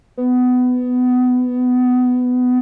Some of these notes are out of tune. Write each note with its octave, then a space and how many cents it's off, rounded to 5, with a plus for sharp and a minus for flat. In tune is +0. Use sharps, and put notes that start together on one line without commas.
B3 +20